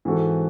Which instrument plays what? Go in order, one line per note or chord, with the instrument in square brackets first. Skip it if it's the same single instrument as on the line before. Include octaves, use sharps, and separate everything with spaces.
[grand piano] G#2 E3 C4 F#4 A4